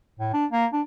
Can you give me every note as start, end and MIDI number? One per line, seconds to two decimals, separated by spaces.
0.19 0.32 45
0.33 0.46 62
0.52 0.66 58
0.73 0.82 62